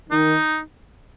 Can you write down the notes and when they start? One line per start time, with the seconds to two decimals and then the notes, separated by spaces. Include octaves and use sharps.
0.10 D#3 D#4